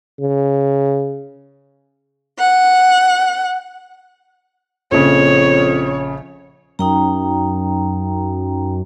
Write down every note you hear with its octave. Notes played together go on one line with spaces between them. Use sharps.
C#3
F#5
A#1 F2 C#3 C#5
F#2 D#4 G5 A#5